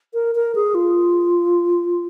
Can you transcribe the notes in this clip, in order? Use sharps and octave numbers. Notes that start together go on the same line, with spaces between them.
A#4
A#4
G#4
F4